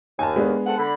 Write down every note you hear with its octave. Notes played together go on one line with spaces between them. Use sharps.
D#2 G#5 A5
G#3 B3 D4
C4 A4 F#5
D3 B5